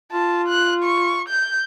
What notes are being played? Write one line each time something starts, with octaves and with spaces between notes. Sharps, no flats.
F4 A5
F#6
C#6
G6